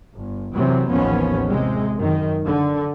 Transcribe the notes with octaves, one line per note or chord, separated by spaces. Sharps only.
G1
F#2 C3 E3 F#3
A1 D#2 F3 B3 C#4
C3 G#3
F#2 D#3
D3